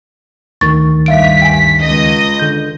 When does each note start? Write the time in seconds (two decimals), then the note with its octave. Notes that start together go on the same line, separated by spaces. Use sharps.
0.61 D2 D#3 C#6 A6
1.06 G2 E5 F5 B6 D7
1.42 G5 G#5
1.82 C#2 D#5
2.39 D3 G6